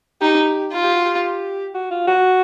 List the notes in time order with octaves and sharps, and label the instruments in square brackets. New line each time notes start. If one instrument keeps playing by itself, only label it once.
[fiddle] D#4 [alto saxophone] G4
[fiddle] F4
[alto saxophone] G4
F#4
G4
F#4
F4
F#4